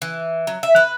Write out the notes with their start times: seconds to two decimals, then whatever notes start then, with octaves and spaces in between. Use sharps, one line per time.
0.02 E3
0.47 F#3
0.63 E5
0.76 B4